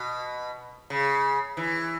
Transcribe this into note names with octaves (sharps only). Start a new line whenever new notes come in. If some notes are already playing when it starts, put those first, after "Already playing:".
Already playing: B2
C#3
E3